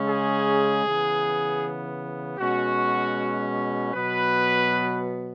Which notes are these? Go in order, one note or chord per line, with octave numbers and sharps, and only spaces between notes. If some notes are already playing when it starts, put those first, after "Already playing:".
Already playing: C#3 G#3 C#4
G#4
C#3 E3 B3
B2 G#3 C#4 F#4
B2 F#3 B3 B4